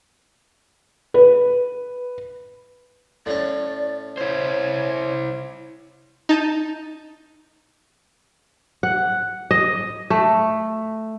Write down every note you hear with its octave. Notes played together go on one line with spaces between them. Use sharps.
B4
A2 C#4 D5
E4 C5 C#5
D#4 A5 G6 D#7
F#5
D#5
A3